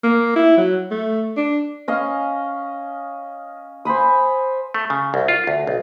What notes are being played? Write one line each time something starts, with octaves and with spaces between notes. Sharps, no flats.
A#3
E4
F#3
A3
D4
C#4 D#5 F5 G#5
C5 G#5 B5 D#6
A3
C#3
C2
F4
D2
B1